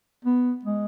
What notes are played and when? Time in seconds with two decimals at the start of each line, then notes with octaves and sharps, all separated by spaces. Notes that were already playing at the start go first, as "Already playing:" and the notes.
0.25 B3
0.64 G#3